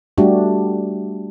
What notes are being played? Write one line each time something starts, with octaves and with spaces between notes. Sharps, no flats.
G3 A3 D4 F#4 G4